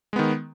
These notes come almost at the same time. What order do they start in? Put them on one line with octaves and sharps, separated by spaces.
G#3 B3 D#3